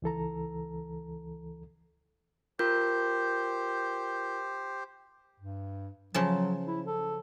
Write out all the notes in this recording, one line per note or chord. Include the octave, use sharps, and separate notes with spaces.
C#2 E3 A4 A#5
F4 G4 A#4 C5 G6
G2
C#3 F3 F#3 A5
E4
A4